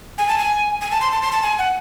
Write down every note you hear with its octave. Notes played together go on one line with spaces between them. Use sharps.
G#5
A5
G#5
G#5
A5
C6
A5
C6
A5
G#5
F#5